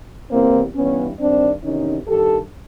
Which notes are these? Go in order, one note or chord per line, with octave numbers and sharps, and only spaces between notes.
E2 C3 E3 A#3 C4
G2 E3 B3 C#4
G2 D#3 C4 D4
E2 C3 D#3 C#4 D#4
G2 D#3 G4 A4